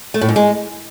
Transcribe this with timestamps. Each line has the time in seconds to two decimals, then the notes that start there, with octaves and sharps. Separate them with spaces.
0.14 A3
0.21 A2
0.29 G#2
0.36 G#3